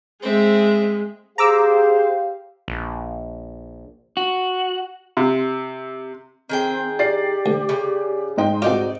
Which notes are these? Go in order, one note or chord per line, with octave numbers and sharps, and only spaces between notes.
G#3 C4 E5
G4 G#4 C5 F5 A#5 D6 E6
A#1
F#4
C3
D#3 C4 G#4 G5
G4 D5 A6 C7
D2
C#3
G#2 D#5 G5 C6
C2 D#4 F4 F#4 D5